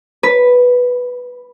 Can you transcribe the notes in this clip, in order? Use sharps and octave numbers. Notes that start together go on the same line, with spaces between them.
B4